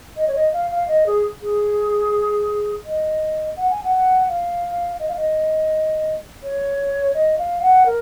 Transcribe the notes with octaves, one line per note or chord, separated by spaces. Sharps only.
D#5
C#5
D#5
F5
F5
D#5
G#4
G#4
D#5
F#5
G#5
F#5
F5
D#5
F5
D#5
C#5
D#5
F5
F#5
A#4